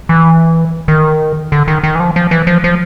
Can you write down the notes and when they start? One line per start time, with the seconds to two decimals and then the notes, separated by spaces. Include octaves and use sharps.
0.09 E3
0.88 D#3
1.52 D3
1.68 D#3
1.84 D#3
1.95 E3
2.00 F3
2.16 F3
2.31 E3
2.47 F3
2.64 F3